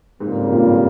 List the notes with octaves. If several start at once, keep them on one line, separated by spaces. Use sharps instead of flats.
F2 G#2 C#3 G3 A#3
G2 A#2